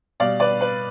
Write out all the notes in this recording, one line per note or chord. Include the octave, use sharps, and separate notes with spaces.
B2 G3 D5 F5
B4 D5
B4